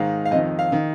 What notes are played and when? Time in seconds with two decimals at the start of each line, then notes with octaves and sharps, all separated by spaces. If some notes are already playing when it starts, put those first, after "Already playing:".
Already playing: G#2 D#3 F5
0.25 F5
0.31 F2 D#5
0.35 D#3
0.59 F5
0.72 D#3